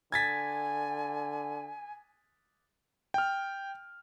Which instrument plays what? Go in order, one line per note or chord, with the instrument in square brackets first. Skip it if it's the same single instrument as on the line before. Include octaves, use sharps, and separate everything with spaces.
[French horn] D3 [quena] G#5 [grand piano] G#6 A6 B6
[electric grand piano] G5 F6